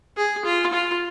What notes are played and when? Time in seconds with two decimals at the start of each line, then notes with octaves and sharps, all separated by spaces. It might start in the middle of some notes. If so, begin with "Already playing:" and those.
0.17 G#4
0.45 F4
0.73 F4